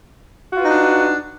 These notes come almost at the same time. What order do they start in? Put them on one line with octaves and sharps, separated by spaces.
F#4 F4 B4 D#4 D4